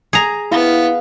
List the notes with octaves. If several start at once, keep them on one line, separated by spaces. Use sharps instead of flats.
G#4 A#5
B3 E4 F5